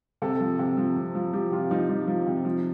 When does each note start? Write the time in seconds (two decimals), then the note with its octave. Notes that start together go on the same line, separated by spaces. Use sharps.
0.22 C3 A4
0.40 F3
0.59 C3
0.77 F3
0.96 C3
1.15 F3
1.33 F3 G4
1.52 C3 F4
1.71 F3 D#4
1.89 F3 D#4
2.07 F3
2.26 C3
2.45 F3